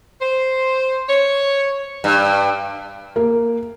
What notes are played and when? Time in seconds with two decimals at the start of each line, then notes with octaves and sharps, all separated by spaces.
0.21 C5
1.09 C#5
2.04 G2
3.16 A#3